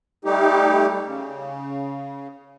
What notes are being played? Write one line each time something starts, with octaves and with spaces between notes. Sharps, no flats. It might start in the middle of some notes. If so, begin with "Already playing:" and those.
G3 A3 D#4 G4
C#3